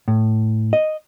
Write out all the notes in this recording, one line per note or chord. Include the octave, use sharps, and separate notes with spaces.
A2
D#5